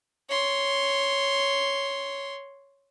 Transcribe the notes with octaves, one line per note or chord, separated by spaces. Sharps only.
C#5 C6